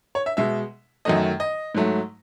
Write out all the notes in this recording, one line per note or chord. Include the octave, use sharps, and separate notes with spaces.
C#5
E5
B2 G#3 E5
F#2 D#3 F#3 A3 D#5
D#5
G#2 F#3 A3